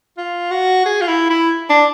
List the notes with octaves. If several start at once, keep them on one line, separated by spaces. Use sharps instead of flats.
F4
F#4
G#4
F4
E4
E4
D4